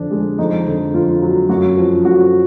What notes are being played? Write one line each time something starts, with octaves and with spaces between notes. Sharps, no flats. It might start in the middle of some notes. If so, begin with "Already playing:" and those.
Already playing: F2 D3 D4
G#3
F2 D#4
D3
F2 F4
F#3
F#2 F#4
F3
F#2 F#4